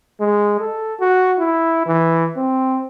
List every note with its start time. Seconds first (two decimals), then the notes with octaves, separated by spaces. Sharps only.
0.21 G#3
0.60 A4
1.00 F#4
1.39 E4
1.86 E3
2.37 C4